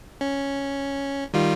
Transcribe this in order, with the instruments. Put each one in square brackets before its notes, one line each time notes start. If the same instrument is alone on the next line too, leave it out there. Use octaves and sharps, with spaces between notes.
[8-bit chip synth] C#4
D#3 G3 F4